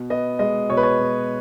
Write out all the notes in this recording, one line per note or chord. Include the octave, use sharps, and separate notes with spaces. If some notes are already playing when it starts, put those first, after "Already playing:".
Already playing: B2
B3 D#5
G#3 D#5
B2 C#5
B4
C#5
B2